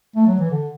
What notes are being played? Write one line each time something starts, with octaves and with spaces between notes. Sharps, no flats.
A3
F#3
E3
D3